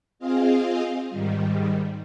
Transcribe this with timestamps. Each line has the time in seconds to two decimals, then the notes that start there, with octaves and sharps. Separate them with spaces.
0.19 C4 F4 G#4 D#5 F5
1.10 G#2 D#3 G3